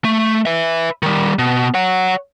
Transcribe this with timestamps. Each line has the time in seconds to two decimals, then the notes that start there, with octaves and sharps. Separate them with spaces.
0.05 A3
0.46 B4 E5
1.03 D#3 G3
1.39 B2
1.74 C#5 F#5